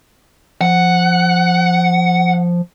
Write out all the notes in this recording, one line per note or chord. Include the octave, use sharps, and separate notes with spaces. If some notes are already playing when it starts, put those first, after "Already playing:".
F3 F#5